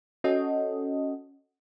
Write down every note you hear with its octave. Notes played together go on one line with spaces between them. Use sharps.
C#4 F#4 A4 D#5